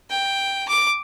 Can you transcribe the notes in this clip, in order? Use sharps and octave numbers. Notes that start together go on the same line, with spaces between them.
G5
D6